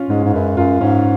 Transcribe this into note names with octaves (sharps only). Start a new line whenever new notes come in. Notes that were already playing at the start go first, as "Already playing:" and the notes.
Already playing: C#4 F4
G#2 G#3
G#2
F#2 B4
F#2 F4
G#2 C#4